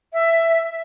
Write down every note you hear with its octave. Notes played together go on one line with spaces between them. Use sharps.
E5